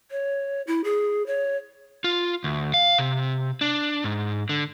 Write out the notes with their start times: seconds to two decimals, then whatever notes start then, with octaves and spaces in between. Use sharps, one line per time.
0.11 C#5
0.67 E4
0.84 G#4
1.26 C#5
2.04 F4
2.44 D2
2.74 F5
2.98 C3
3.61 D4
4.04 G#2
4.49 D3